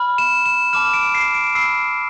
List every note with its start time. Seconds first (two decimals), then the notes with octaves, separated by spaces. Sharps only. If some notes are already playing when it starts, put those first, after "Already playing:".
Already playing: B5 F6
0.18 E7
0.46 E7
0.73 A5 D6 F6 E7
0.94 D7
1.15 C7
1.34 D7
1.55 B5 E6 C7